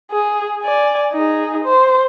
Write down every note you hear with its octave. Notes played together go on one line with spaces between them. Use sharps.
G#4
D5 G#5
D#4 G#4
C5